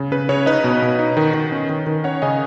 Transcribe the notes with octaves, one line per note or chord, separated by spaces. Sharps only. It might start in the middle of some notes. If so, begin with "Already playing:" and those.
Already playing: C#3
C#3 B4
C#3 C#5
D#4 B4 D#5
B2
B2
D#4
D#3
D#3
C#4
D#3
D#3
C#4 C#5 F#5
C#3 D#5 G#5